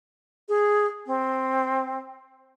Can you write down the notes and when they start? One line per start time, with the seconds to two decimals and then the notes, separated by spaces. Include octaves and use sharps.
0.49 G#4
1.07 C4